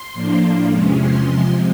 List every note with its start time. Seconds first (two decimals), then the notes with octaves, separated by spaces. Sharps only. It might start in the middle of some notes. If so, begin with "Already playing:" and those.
Already playing: C6
0.13 A2 F3 A#3 D4
0.70 E2 C3 F3 G#3 C#4
0.98 C6
1.26 C3 F3 G#3 C6